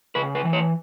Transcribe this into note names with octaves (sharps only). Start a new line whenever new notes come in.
C#3 B4
B4
E3
C#5